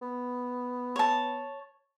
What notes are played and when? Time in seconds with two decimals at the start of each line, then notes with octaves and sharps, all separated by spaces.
0.02 B3
0.96 C#5 A5